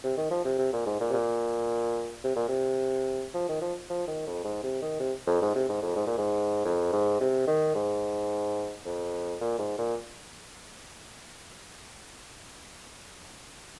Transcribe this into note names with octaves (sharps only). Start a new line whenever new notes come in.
C3
D#3
F3
C3
C3
A#2
G#2
A#2
C3
A#2
C3
A#2
C3
F3
D#3
F3
F3
D#3
F2
G#2
C3
D#3
C3
F2
G#2
C3
G#2
F2
G#2
A#2
G#2
F2
G#2
C3
D#3
G#2
F2
A#2
G#2
A#2